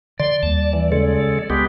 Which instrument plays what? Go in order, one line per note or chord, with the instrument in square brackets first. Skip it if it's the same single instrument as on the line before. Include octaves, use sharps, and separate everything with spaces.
[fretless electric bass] D3 [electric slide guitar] D5 [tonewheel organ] C6
[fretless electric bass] D#2 G3 [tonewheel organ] A5
[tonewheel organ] E3
C#3 G#3 A4
[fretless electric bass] C#2 [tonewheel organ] G#3 B3 G4